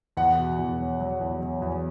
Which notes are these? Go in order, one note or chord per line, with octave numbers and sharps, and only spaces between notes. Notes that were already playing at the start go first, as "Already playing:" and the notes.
E2 F#5
B2
E2
F#3
F#3
E2
F#3
E2